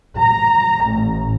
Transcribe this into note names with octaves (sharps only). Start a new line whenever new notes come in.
A#5
A1